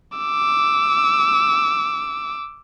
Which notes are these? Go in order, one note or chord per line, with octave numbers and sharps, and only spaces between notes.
D6 E6